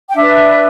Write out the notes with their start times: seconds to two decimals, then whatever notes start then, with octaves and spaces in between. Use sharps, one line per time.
0.10 G5
0.15 D4 B4 E5